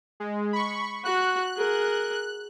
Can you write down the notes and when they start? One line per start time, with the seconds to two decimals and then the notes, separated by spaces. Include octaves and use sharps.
0.20 G#3
0.53 B5 C#6
1.05 F#4 F#6
1.57 G#4 A#4